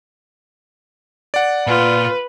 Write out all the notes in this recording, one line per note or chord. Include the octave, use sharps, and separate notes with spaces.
D5 F#5
A#2 F4 B4